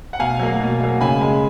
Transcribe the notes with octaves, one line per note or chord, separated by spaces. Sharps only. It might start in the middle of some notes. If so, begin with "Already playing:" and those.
F#5
B2 F5 G#5
F#3 A#3
B2
F#3 A#3
C#3 G#5 B5
G#3